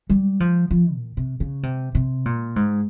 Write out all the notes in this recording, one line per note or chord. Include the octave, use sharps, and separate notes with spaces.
G3
F3
F3
A#2
C3
C#3
C3
C3
A#2
G#2